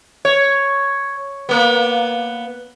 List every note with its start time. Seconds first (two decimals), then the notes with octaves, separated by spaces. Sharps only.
0.25 C#5
1.49 A#3 B3